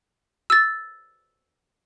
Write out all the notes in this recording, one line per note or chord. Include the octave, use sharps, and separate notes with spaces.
E6 A6